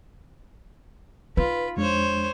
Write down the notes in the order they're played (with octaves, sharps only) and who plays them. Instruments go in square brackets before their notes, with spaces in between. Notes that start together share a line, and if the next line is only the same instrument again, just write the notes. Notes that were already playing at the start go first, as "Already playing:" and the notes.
[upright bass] D#4 [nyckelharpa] F4 B5 [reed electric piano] B4
[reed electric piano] F2 G#3 D4 [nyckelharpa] C5 C#5